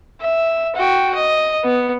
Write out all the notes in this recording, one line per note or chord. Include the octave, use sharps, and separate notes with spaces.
E5
F#4 G5
D#5
B3